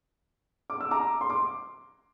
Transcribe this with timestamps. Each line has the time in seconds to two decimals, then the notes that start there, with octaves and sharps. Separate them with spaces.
0.70 D6
0.81 E6
0.91 A#5 D6
1.21 C6
1.30 D6